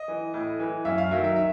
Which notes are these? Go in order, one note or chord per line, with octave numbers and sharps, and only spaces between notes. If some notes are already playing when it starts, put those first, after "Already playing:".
Already playing: D#5
E3
A2
E3
F#2 E5
F5
D#3 F#3 E5
E5
E5